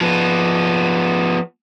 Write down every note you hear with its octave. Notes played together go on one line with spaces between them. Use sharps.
F3 B3